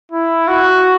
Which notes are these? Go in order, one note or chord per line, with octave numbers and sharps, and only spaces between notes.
E4
F#4